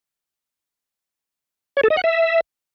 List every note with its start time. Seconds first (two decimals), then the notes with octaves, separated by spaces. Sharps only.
1.77 C#5
1.84 A4
1.90 D#5
1.97 F#5
2.04 E5